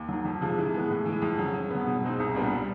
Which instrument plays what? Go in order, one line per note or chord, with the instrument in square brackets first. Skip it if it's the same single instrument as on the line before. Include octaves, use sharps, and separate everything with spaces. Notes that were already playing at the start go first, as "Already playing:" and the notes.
Already playing: [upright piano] D#2
D#3 F#3
F2
C3 F3 G#3
E3
G#3 B3
A2
E3 G#3
F2
C#3 F#3
C#3
F#3 B3
B2
G#3 C4 D#4
C2
A#2 G3 B3 D4